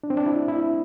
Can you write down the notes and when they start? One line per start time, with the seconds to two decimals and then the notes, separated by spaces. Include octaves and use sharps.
0.03 D4
0.10 C4
0.17 D4
0.26 E4
0.48 E4